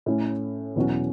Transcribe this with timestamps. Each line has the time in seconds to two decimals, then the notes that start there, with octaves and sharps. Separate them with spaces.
0.06 A2 A3 C#4 E4
0.75 E2 B2 F#3 C#4 F#4